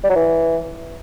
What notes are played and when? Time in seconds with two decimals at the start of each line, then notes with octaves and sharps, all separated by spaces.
0.04 G3
0.10 F#3
0.16 E3